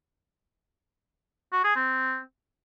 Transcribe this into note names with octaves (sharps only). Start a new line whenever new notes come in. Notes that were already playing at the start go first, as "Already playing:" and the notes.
F#4
G#4
C4